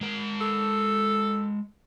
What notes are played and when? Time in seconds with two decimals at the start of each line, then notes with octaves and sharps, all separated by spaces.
0.01 G#3 A#4
0.41 A4